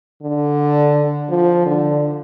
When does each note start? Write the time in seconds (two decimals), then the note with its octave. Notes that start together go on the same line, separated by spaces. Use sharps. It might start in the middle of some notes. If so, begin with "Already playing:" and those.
0.22 D3
1.29 F3
1.66 D3